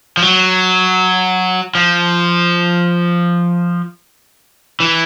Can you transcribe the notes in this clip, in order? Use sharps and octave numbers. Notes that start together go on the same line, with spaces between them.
F3
F#3
F3
E3